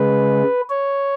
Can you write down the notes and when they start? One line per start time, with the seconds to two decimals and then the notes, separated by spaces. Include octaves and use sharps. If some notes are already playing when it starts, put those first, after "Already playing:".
Already playing: C#3 G#3 B4
0.70 C#5